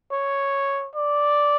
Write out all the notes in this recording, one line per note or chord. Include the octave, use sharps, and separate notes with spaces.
C#5
D5